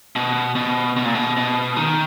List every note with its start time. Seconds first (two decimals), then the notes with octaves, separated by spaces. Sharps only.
0.16 B2
0.55 B2
0.96 B2
1.05 A#2
1.15 B2
1.37 B2
1.77 D#3